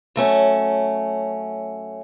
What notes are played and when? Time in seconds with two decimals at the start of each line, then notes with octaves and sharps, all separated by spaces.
0.16 F#2 A3 C#4